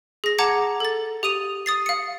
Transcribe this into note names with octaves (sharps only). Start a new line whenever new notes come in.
G#4 A#6
F#5 A5 A#5 D6 G#6 C#7
A4 A6
G4 D#6 D#7 F7
D#6 A6 C7
F5 C#7